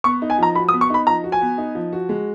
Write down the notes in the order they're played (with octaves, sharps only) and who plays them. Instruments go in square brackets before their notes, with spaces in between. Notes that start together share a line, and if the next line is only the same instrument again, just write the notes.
[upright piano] B3 [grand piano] C#6
[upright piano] D#4
[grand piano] G#5
[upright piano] F3 [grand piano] A#5
[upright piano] F#4 [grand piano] B5
[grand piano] D#6
[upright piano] B3
[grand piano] C#6
[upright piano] D#4 [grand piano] B5
[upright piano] F3 [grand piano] A#5
[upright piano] F#4
[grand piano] G#5
[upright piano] B3
D#4
F3
F#4
G#3